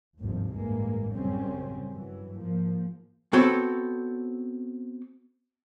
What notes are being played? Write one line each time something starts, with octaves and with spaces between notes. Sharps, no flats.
G1 D#2 G#2 C3 D#3 F3
A1 G2 E3 G#3 A#3
F#2 C#3 G3 C4 C#4
G2 E3 F#3
G#2 F3 A#3
B3 C4 F#4 A4 C#5